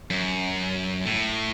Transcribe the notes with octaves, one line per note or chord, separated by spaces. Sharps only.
F#2
A2